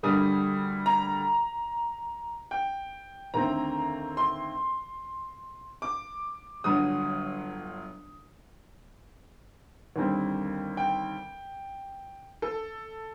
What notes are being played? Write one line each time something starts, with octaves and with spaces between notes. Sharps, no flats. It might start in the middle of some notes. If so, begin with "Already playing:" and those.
D2 D3 G3 A#3 D#6
A#5
G5
D#2 D3 A3 C4 A#5
C6
D6
G1 G2 F#3 D#6
D#2 D3 G3 C4
G5
A4